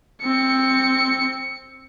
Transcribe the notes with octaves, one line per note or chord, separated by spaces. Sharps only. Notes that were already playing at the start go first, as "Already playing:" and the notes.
C4 C#7